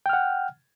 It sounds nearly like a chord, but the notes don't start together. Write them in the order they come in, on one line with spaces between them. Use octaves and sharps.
G5 F6 F#5